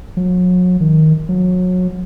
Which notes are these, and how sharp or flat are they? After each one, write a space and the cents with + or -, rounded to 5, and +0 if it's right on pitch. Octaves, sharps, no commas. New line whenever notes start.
F#3 -35
D#3 +10
F#3 -25